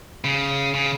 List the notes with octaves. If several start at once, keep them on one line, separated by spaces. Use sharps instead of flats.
C#3
C#3